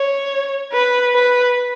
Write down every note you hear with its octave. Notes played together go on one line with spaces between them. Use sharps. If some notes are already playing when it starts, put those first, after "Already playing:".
Already playing: C#5
B4
B4